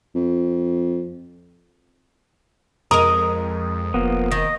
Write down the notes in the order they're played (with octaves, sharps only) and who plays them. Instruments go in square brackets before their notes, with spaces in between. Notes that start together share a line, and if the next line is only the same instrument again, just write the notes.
[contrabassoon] F2
[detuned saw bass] F2 [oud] G#3 A#4 [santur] D#6
[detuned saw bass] F1 [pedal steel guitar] F3 A#3 B3
[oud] D#3 [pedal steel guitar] D#5